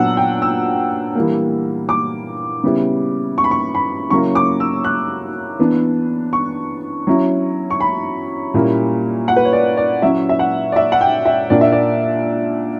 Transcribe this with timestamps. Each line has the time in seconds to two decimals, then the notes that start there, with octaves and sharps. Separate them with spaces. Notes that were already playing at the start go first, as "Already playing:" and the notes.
Already playing: A#2 F#3 B3 D4 F#5 E6
0.17 G5
0.42 E6
1.15 E3 G3 A#3
1.89 D6
2.64 C#3 G3 B3 E4
3.38 C#6
3.44 B5
3.51 C#6
3.75 B5
4.10 C#3 F#3 A#3 C#4 E4 C#6
4.35 D6
4.60 E6
4.84 F#6
5.59 E3 B3 D4
6.33 C#6
7.07 F#3 C#4 E4
7.70 C#6
7.80 B5
8.54 A#2 G3 A#3 C#4 E4
9.28 F#5
9.36 B4
9.45 C#5
9.53 D5
9.77 D5
10.02 F#3 C#4 E4 E5
10.29 E5
10.39 F#5
10.72 D5
10.76 E5
10.92 F#5
11.01 G5
11.26 E5
11.50 A#2 A#3 D4 D5
11.61 E5
11.72 D5